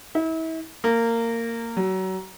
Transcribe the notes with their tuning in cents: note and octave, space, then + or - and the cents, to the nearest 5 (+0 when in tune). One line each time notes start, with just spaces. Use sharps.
E4 -35
A#3 -20
F#3 +30